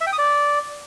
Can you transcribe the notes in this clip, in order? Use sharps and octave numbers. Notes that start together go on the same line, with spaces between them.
E5
G5
D#6
D5